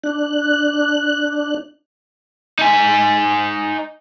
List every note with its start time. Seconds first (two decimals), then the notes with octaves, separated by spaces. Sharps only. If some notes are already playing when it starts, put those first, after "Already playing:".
0.04 D4 F#6
2.59 D#4 G#5